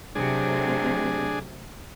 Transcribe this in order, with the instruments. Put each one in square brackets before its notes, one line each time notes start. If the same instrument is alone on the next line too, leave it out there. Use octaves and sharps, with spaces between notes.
[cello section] C3 F#3 A3 [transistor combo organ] D4 G#4